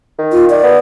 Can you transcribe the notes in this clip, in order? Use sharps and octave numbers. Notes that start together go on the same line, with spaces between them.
D#3
F4
D5
B3